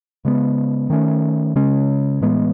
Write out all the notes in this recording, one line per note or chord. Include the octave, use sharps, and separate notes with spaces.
C#3 G#3 B3
D#3 A3 C#4
C#3 G#3 C#4
A2 E3 G#3 B3